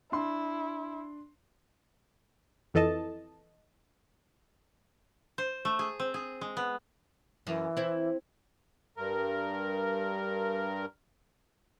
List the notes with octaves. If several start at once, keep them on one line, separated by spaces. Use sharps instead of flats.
D4 E4 C6
F2 E3 A4 D#5 A5
C5
A3
G#4
C4
G#4
G#3
B3
F#2 E3
C4 E4
G2 A#4